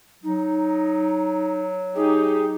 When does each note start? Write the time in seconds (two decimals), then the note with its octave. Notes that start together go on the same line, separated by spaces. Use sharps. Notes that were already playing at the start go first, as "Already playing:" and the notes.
0.23 F#3 D#4
1.96 D#4 G4 G#4